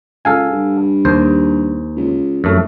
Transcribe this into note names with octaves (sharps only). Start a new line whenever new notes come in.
C#2 A4 F5 G#5
G2
D#2 C5
C#2
F1 F#2 A3